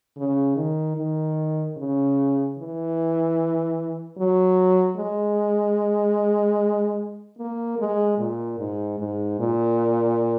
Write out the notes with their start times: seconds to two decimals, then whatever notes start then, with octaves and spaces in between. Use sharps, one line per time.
0.17 C#3
0.56 D#3
0.97 D#3
1.77 C#3
2.58 E3
4.18 F#3
4.97 G#3
7.38 A#3
7.79 G#3
8.18 A#2
8.59 G#2
8.99 G#2
9.39 A#2